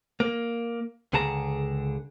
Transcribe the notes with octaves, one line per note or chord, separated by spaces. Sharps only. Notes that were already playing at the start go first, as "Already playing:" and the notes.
A#3
C#2 D3 G#4 A5 A#5